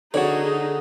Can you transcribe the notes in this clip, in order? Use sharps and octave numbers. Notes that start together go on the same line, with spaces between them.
D3 D#4 F#4 G#4 C#5 D5